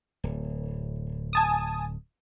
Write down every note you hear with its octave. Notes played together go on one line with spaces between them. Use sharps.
D1
G#5 A5 D#6